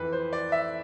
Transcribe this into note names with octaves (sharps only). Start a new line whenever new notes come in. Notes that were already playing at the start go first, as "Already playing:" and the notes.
Already playing: F2 E3 B4
C5
D5
E5